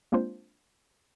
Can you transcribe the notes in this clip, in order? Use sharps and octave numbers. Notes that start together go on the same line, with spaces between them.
G#3 A#3 C4 D4 F4 C5